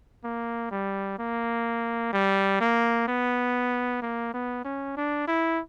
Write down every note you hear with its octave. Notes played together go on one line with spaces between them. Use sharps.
A#3
G3
A#3
G3
A#3
B3
A#3
B3
C#4
D4
E4